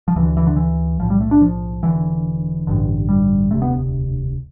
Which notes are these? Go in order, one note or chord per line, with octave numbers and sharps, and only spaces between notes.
F3
D2 D3 E3
E3
D3
E3
B1 A2 F3
G3
A3
D4
F3
E1 E2 D3 E3
A1 G2 D3
G3
E1 D2 C3 A3
B3